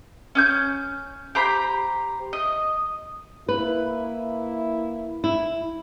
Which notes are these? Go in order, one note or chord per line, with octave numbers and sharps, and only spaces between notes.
C#4 D#6 G6
G4 C5 A#5 B5
D#5
A#3 E4 B4
E4